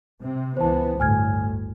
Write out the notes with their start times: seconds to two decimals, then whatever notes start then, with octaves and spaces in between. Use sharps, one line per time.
0.21 C3 C4
0.57 C#2 E3 B3 C5 A5
1.00 G1 D2 A2 G#5 F6 G#6